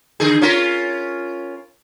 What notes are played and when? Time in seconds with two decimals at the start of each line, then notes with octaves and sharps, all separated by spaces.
0.20 D3 G#4
0.42 C#4 F4 A#4